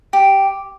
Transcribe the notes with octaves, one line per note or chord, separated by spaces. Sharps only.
G4